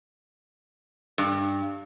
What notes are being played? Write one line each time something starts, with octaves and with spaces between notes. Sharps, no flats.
G2